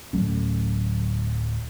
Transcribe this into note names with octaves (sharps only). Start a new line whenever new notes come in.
D1 F#3 A3 C#4